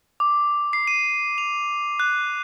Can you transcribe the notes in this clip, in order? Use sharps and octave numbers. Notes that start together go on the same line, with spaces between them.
D6
C7
D#7
F7
F#6